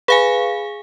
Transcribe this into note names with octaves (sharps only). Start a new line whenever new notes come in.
G#4 B4 F5 G#5